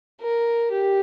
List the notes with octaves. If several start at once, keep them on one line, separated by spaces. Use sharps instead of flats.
A#4
G4